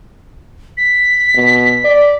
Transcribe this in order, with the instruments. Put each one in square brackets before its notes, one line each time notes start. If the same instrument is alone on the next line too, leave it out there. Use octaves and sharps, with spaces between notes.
[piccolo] B6
[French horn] B2
D5